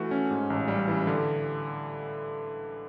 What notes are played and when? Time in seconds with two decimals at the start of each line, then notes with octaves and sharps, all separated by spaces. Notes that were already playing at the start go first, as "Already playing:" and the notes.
Already playing: E3 A3 F#4
0.11 C#4
0.31 G#2
0.50 A1
0.68 G3
0.88 E3
1.07 D3